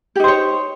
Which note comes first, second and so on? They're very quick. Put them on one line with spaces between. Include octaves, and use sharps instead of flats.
G4 D#4 C5 C#5